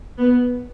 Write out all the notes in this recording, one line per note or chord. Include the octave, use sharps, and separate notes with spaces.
B3